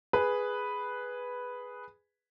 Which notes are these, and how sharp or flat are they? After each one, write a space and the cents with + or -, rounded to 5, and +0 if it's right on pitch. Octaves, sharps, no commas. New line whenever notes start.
G#4 +0 B4 +0